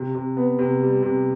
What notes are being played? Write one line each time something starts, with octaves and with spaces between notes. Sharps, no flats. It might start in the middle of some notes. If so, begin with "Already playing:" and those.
Already playing: C3
C3
B3
C3
G3
C3